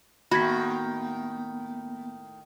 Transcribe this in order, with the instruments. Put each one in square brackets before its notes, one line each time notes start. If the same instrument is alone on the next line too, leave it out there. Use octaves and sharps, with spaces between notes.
[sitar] A2 D#3 [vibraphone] A#3 B3 [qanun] F#4 [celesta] B5 G#6 B6